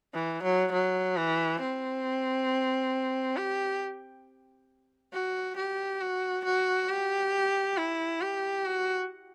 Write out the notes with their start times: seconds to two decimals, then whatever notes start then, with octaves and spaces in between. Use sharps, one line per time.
0.14 E3
0.43 F#3
0.72 F#3
1.16 E3
1.61 C4
3.37 G4
5.13 F#4
5.57 G4
6.01 F#4
6.45 F#4
6.89 G4
7.77 E4
8.21 G4
8.65 F#4